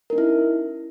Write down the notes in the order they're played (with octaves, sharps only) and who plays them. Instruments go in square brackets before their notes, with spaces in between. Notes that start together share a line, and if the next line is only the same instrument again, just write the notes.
[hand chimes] A#4
D#4
C#4
E4